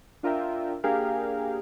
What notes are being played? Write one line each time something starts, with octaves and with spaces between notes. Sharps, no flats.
D4 F4 A#4 E5 G5
A#3 D4 G4 G#4 A#4 F5